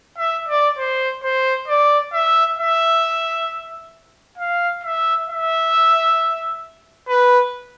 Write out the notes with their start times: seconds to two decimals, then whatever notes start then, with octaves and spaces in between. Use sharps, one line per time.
0.18 E5
0.48 D5
0.78 C5
1.23 C5
1.68 D5
2.13 E5
2.59 E5
4.38 F5
4.83 E5
5.29 E5
7.08 B4